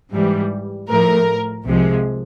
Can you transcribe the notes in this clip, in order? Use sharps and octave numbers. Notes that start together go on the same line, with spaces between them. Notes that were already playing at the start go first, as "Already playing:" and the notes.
G#2 E3 G3
A2 F3 A3 A#4
C2 C3 F3 G#3